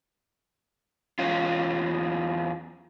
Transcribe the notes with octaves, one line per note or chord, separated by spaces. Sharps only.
E2 C#4 F4